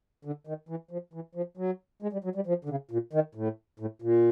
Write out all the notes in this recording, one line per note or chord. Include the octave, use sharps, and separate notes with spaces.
D3
D#3
E3
F3
E3
F3
F#3
G#3
G3
F#3
G3
F3
D3
C#3
A#2
D#3
A2
A2
A#2